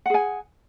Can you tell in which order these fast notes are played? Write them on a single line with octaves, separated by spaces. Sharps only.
F#5 G#4 G#5